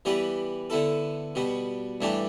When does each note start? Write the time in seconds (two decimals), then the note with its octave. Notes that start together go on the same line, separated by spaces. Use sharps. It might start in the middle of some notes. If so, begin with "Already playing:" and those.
0.05 E3 G3 B3 G4 B4
0.70 D3 B3 E4 A4
1.35 B2 G3 B3
2.01 G2 E3 A3 D4 G4